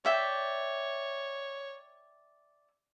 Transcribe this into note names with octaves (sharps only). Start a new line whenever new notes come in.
C#5 D5 E5 G5